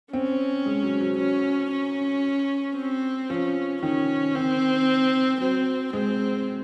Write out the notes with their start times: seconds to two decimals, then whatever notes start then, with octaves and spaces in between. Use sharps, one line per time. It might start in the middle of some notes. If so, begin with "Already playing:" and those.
0.13 C4 C#4
0.66 G#3
0.83 F#3
1.01 F#3
1.18 F#3 C#4
1.71 C#4
2.77 C4
3.30 F3 C#4
3.83 D#3 C#4
4.35 D#3 C4
5.41 F#3 C4
5.93 G#3 C4